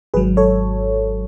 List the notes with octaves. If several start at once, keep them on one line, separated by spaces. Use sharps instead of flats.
G#1 G#2 F#3 G#4 B4
A4 C#5